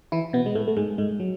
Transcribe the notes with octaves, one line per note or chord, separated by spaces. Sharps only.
E3 E4
B2 B3
G#3
A2 A3
A3
G#2 G#3
G#2 G#3
F#3